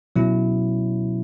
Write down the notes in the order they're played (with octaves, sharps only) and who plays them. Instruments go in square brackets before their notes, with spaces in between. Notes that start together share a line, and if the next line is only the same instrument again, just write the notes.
[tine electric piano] B2 F#3 C#4 E4